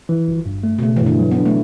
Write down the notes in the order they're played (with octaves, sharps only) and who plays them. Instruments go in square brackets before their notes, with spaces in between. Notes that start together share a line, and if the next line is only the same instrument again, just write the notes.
[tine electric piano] E3
G1
G2
A3
[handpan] B2
[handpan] C#3 [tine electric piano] A3
[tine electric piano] G2 [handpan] E3
[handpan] D3
[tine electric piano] F#3
[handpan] B3
[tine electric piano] D4
[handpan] A3